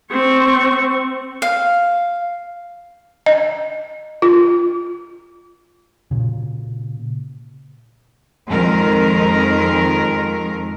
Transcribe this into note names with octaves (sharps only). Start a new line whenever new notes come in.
C4 C#6
F5
D#5
F4
A#2 C#3
F2 D#3 G#3 A#4